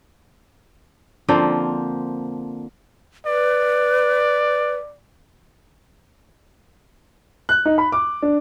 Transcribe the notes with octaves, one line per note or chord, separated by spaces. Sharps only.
D3 F3 A#3 C4
B4 D5
F#6
D#4
B5
D6
D4